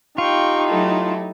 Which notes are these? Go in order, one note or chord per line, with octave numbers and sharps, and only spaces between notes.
D#4 F4 G4 G5 C#6
F#3 A3 E4 A4